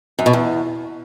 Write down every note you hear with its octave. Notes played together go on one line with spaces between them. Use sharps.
F#2
B2
E2